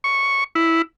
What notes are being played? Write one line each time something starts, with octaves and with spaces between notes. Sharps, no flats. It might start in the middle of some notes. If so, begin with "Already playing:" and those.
C#6
E4